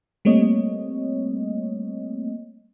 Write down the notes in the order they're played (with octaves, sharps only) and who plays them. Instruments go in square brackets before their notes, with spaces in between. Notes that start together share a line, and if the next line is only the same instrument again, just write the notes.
[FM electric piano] G3 A3 A#3 C4 C#5 D#5